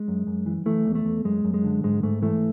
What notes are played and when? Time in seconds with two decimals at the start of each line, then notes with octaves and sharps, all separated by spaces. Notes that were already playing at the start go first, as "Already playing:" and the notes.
Already playing: G#3
0.08 F#2
0.27 F#2
0.46 E3
0.66 E3 A3
0.85 E2
0.95 A3
1.05 E2
1.25 F#2 G#3
1.45 F#2
1.54 G#3
1.64 D3
1.84 G#2 G#3
2.03 G#2 A3
2.22 E3 A3